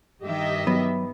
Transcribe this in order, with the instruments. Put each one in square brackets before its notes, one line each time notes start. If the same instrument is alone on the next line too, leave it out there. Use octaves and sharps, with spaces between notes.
[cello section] G2 D#3 [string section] G4 D#5 E5
[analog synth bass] F#3 [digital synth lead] B3